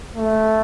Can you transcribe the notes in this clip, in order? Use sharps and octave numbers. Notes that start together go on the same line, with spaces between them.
A3